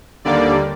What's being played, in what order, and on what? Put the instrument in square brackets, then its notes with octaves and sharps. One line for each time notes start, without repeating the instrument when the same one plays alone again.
[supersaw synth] D#2 D3 G3 A#3 D5